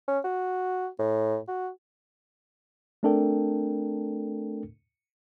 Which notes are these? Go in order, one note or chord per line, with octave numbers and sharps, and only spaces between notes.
C#4
F#4
A2
F#4
A3 C4 D4 A4 A#4 G5